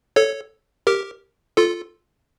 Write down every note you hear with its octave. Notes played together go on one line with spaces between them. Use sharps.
A4 C#5
G4 A#4
F4 A4